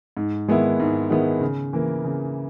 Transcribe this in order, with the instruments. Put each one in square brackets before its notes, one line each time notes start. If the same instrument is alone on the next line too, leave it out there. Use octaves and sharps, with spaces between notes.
[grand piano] G#2
D#3 G#3 B3 E4
G#2
D#3 G#3 B3 E4
C#3
E3 A#3
C#3